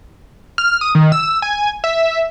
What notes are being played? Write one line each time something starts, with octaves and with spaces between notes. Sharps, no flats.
F6
D#6
D#3
E6
G#5
E5